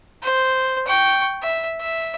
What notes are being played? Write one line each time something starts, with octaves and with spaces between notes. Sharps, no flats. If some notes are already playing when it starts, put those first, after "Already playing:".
C5
G5 C#6
E5
E5